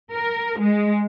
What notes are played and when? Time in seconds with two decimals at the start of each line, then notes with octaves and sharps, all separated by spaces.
0.13 A#4
0.60 G#3